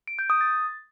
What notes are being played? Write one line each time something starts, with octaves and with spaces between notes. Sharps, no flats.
D7
G6
D#6
A6